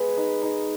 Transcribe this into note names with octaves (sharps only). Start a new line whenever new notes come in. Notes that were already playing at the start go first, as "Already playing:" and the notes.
Already playing: G#3 B3 G#4 B4
D#4
D#4